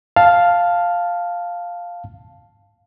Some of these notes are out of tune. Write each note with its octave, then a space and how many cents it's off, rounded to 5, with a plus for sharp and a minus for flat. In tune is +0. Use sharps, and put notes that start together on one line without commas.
F5 +0 A5 +0